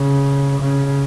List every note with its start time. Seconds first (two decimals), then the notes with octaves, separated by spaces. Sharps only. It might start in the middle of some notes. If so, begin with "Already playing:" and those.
Already playing: C#3
0.60 C#3